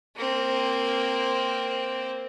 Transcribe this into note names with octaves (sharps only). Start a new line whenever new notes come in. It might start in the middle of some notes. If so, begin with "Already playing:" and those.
A#3 C4